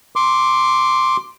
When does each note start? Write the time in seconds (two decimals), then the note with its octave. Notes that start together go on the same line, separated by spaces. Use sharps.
0.16 C6 D6